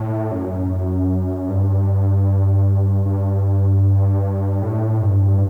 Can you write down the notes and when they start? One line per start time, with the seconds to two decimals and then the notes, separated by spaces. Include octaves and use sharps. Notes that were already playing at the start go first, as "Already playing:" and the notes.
Already playing: A2
0.32 F#2
1.49 G2
3.06 G2
4.62 A2
5.02 G2